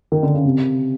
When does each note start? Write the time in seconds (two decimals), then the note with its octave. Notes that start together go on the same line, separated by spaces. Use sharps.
0.12 D#3
0.23 D3
0.35 C#3
0.45 C3